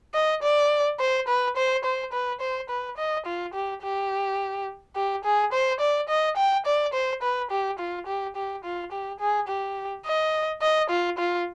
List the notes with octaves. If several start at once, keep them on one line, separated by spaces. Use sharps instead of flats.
D#5
D5
C5
B4
C5
C5
B4
C5
B4
D#5
F4
G4
G4
G4
G#4
C5
D5
D#5
G5
D5
C5
B4
G4
F4
G4
G4
F4
G4
G#4
G4
D#5
D#5
F4
F4